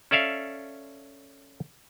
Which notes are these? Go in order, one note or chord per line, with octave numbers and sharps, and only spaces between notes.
C#4 A4 D5 E5 F5